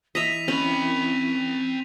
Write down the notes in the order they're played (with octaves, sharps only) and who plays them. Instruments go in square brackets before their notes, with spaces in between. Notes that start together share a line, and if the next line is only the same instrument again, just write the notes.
[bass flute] E3 [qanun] D#5 E5 [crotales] B6 D#7 F7
[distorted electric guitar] C4 B5 [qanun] C#4